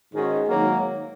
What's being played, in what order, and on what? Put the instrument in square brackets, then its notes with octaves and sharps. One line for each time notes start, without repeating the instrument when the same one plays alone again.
[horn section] G#2 D#3 G#3 C#4 F#4
G#2 D#3 F#3 A#3